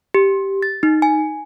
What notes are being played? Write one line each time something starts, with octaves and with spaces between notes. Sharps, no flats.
G4
A6
D#4
G#5